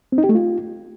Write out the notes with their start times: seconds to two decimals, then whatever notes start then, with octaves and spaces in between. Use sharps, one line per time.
0.12 C4
0.18 D#4
0.24 G4
0.29 A3
0.35 F4